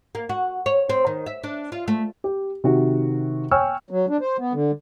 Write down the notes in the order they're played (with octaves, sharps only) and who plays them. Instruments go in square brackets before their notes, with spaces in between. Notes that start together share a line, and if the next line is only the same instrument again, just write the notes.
[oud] A#3
F#4
C#5
C4
D#3
E5
D4
F4
A3
[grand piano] G4
C3 D#3 F#4
C#5 G5 G#5 C#6 E6 F6
[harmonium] F#3
D4
C5
B3
D3